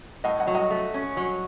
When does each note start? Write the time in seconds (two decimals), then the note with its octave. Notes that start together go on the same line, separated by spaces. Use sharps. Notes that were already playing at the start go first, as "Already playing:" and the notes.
0.24 A2 D#5 F#5
0.40 D#5 F#5
0.47 F#3
0.55 D#5 F#5
0.70 A3
0.94 C#4
1.17 F#3